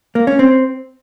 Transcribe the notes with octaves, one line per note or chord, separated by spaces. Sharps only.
A#3
C#4
C4